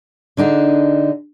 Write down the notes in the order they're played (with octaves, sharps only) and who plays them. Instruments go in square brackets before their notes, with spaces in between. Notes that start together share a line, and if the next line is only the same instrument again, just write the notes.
[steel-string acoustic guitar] D3 D4 D#4 G#4